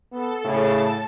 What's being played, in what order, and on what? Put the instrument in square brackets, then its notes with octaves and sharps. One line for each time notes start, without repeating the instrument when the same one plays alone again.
[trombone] B3 [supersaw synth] A4
[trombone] A2 [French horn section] C#3 [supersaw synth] A5